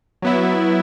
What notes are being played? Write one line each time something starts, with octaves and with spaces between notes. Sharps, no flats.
F#3 B3 E4